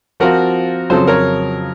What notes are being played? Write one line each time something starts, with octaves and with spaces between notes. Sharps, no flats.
F3 C4 F4 F#4 A#4
F2 C#3 F#3 A4 C5
A#4 C#5